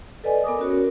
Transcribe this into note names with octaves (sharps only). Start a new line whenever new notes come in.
A4 B4 D5 D#5 G#5
B3 A#4 D6 D#6
C#4 F#4 C#5
A#4